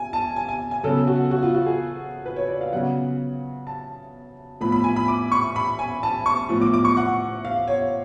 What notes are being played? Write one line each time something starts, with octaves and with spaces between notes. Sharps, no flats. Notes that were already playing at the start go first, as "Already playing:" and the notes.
Already playing: G#5
A5
G#5
G#5
G#5
C#3 F#3 B3 A4
F#4
F#4
F4
F#4
G#4
B4
C#5
D5
F5
C#3 F#3 B3 F#5
A5
A2 F3 B3 B5
B5
G#5
B5
D6
C#6
B5
G#5
A5
C#6
A2 F3 B3
D6
D6
C#6
F#5
F5
C#5